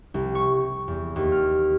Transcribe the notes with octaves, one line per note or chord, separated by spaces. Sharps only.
C2
C#6
E2
D#2
F6